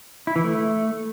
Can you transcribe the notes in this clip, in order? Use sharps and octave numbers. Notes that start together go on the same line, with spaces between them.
E4
E3
A3